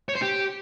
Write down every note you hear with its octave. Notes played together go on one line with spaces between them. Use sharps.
C#5
C5
G4